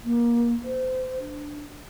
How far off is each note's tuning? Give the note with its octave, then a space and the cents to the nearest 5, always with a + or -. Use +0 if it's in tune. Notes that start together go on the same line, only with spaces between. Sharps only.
A#3 +25
C5 -30
D4 +5